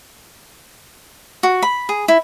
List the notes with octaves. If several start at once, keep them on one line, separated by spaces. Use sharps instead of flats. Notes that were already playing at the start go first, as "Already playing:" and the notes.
F#4
B5
G#4
E4